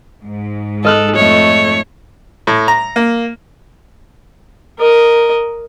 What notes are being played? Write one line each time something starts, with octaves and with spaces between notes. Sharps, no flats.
G#2
A4 D#5 F6 F#6
F2 A3 C#5
A2
A#5
A#3
A#4 D#5